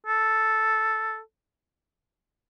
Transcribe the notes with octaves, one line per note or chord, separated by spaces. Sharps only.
A4